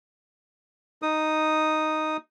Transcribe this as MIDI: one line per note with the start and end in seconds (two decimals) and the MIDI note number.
1.02 2.17 63
1.02 2.17 87